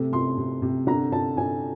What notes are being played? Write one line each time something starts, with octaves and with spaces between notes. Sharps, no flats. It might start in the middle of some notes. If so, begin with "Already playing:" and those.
Already playing: C3 A3
C3 C6
C3
C3
D3 A#5
D3 A5
D3 G#5